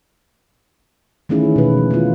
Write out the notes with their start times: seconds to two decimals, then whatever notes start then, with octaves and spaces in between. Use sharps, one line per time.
1.29 D#3 E3 A3 C#4 E4 G#4
1.56 B2 G#3 B4
1.77 F3
1.91 E3 F3 A3 F4